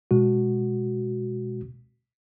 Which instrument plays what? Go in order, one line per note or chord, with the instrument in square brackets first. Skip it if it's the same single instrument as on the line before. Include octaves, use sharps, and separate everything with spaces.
[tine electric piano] B2 G#3 F#4